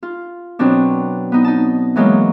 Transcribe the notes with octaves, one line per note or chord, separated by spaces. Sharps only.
F4
B2 F#3 C4 D4
B3 D#4
D#4 A5
E3 F#3 G#3 A#3